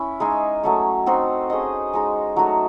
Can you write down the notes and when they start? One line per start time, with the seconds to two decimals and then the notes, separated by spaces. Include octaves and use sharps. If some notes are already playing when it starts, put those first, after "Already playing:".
Already playing: C#4 E4
0.20 G#3 D#4 G#4
0.63 F#3 A3 C#4
1.06 C4 D#4 F#4 C5
1.50 C#4 G#4 C5 D#5
1.93 G#3 D#4 G#4
2.36 F#3 A3 D#4 F#4